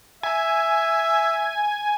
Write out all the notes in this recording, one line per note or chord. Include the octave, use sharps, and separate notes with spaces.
E5 G#5